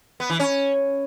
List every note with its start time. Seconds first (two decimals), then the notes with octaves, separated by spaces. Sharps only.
0.20 B3
0.30 E3
0.40 C#4